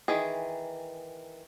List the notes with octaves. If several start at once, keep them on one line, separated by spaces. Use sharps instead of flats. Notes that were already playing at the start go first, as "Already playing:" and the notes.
D#3 E3 G#4